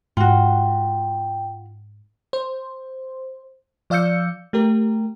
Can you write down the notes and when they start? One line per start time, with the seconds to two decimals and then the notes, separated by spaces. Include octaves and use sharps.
0.17 G#2 F4 F#4 G5
2.33 C5
3.90 F3 D5 F5 E6 G6 C#7
4.53 A3 G4 A#4